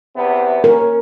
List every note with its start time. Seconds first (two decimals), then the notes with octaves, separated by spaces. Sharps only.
0.17 E2 C3 B3
0.64 C#4 A#4